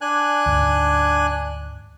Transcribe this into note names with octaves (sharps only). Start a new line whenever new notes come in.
D4 G#5 F#6
D2 G#2